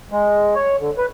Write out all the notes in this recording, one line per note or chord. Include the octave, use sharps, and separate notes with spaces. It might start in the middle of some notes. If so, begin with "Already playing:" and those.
G#3
C#5
D3
B4